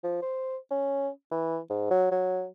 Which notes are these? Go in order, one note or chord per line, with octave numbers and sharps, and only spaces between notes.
F3
C5
C#4
E3
G#2
F#3
F#3